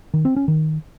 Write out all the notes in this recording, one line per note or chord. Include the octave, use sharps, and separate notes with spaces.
D#3
C4
C#4
D#3